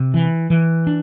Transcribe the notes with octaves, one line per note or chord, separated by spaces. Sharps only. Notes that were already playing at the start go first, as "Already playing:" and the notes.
Already playing: C3
E3
E3
D4